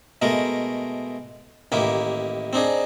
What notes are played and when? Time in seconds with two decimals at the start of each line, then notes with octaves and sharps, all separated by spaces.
0.22 B2 G#3 A3 A#4
1.72 A1 D#3 A#3 E4 G4
2.53 C4 D4 D#4 G#4